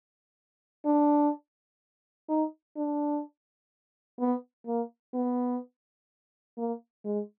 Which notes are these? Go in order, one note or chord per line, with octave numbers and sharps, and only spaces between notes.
D4
D#4
D4
B3
A#3
B3
A#3
G#3